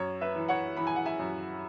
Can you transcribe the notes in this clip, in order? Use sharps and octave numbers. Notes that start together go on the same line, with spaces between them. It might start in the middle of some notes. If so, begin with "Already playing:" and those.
Already playing: F#2 C#5
B4 E5
E3
C#5 F#5
E3 B5
G#5
F#5
E5 G#5
F#2